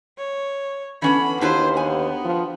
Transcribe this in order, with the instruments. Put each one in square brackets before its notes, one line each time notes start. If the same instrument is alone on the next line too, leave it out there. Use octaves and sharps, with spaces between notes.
[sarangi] C#5
[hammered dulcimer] D3 B3 A4 [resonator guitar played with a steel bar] E3 C#4 D4 [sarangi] B5
[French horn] D#2 [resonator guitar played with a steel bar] D4 E4 B4 [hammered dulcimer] F#4 [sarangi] C5
[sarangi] B3 [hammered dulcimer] G4 [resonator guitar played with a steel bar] G#5
[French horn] F3